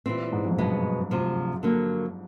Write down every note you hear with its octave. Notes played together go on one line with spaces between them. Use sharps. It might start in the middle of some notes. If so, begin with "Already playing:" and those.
A#2 E3 G3 C4
G#2
F2
F#2
G2 B2 G#3 B3
D2 C3 F3
D3 F#3 A#3